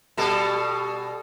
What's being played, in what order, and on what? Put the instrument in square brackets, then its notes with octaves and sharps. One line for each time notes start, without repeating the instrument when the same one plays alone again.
[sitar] B2 G3 A4